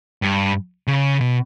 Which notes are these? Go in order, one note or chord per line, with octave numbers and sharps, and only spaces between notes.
G2
C#3
B2